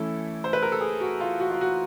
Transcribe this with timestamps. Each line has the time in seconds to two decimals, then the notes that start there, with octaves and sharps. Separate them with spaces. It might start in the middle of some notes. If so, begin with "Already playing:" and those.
Already playing: E3 A3 C#4 E4 A4
0.44 C5
0.53 B4
0.62 A#4
0.72 A4
0.81 G#4
1.01 F#4
1.20 F4
1.40 F#4
1.51 F4
1.61 F#4